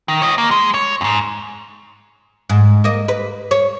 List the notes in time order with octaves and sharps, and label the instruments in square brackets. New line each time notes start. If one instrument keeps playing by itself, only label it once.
[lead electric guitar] D#3
C#5 D#5
A#3
G#3
C#5
F2 G#2
[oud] G#2
A#3 D#5
B4
C#5